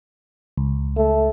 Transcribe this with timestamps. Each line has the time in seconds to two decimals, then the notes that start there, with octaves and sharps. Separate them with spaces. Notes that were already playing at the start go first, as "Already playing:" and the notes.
0.57 C#2
0.97 A3